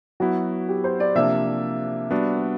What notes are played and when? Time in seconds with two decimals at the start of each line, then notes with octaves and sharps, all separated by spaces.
0.20 F#3 B3 E4 F#4
0.68 G4
0.84 C5
1.00 D5
1.15 C3 F3 A#3 D4 E5
2.11 G3 B3 D4 F#4